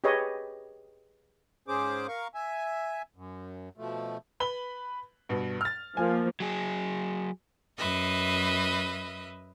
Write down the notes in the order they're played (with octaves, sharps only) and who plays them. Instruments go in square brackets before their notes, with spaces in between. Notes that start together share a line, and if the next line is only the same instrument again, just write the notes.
[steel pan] G4 G#4 B4 C#5 D#5
[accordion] G#2 C#4 G#4 C5 D6
A#4 F5 C#6
E5 G#5
F#2
B2 F3 A3
[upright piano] B4 B5 G7
G2 B2
F6 A6
[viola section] F3 A#3 [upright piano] G#5
[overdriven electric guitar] F#3 G#4
[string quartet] F#2 B4 D#5 E5